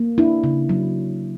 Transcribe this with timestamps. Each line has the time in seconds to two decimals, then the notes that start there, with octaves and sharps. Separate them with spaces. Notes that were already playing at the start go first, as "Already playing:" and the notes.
Already playing: A#3
0.18 D4 E4
0.44 C#3
0.69 F#3